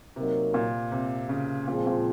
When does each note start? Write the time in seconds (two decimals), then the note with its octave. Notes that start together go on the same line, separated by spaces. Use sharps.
0.16 C3 F#3 A#3 D#4 A#4
0.54 A#2
0.92 C3
1.29 C#3
1.67 A#2 F3 G#3 C4 F4 G#4
1.87 A#2